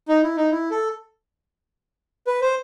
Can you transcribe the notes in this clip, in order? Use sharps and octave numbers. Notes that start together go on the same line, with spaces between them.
D#4
E4
D#4
E4
A4
B4
C5